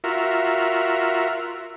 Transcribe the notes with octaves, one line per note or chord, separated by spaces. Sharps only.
F4 F#4 A#4 E5